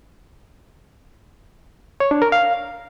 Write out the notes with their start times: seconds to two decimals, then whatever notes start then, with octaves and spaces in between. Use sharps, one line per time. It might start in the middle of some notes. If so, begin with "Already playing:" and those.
2.00 C#5
2.11 D4
2.22 A#4
2.32 F5